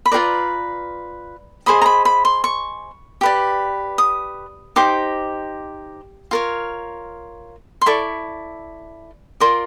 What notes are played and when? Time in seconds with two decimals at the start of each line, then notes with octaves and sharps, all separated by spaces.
0.06 B5
0.12 F4 G#4 B4 D5 A#5
1.66 G#4 C5 D#5 B5
1.82 A#5
1.86 B5
2.05 B5
2.25 C6
2.44 C#6
3.21 G4 B4 D5
3.98 D#6
4.76 D#4 G4 C5 D6
6.31 F4 A#4 C#5
7.81 C6
7.86 E4 A4 D5 C#6
9.40 F4 A#4 D5 C6